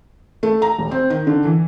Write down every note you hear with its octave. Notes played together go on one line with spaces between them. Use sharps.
A3
A#5
D#1
C4
D#3
D3
E3